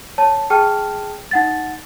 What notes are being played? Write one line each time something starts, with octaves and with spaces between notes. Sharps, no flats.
C#5 A5
G#4 G5 A5 F6
D#4 F#5 A6